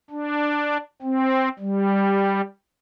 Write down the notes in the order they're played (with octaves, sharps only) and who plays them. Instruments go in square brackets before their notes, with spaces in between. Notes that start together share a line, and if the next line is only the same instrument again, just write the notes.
[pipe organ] D4
C4
G3